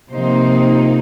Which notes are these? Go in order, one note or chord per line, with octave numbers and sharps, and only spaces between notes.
C3 F3 A#3 D#4 C5